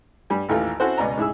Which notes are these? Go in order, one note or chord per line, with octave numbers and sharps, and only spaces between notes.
G2 G3 G#5
A1 D#2 E3 A3 F4
C4 C#4 E4 F#4 A4 C5
C#2 B2 C#4 D5 A#5
G#2 E4 G#4 E6